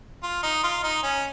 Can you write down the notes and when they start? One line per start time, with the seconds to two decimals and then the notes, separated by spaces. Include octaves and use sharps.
0.23 F4
0.43 D#4
0.63 F4
0.83 D#4
1.03 C#4